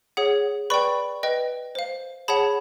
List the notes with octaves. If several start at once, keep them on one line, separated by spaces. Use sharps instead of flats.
G#4 C#5 F#5
B4 D5 G5 B5 C#6
B4 D#5 G5
C5 F5
G#4 C#5 F#5 A5 B5